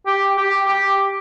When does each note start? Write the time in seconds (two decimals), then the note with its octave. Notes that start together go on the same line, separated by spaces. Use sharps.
0.07 G4
0.37 G4
0.67 G4